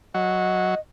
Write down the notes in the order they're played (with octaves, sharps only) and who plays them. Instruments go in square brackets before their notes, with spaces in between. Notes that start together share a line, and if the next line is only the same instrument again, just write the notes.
[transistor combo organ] F#3 [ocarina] D#5